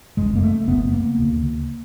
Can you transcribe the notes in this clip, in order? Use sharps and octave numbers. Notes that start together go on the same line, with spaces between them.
F#1 F#2 C#3 G#3
A#3
A3
F#1 F#2 C#3 B3
A#3
D2 C#3